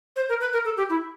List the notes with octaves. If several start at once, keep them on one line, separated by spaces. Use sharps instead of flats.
C5
A#4
B4
A#4
A4
G4
E4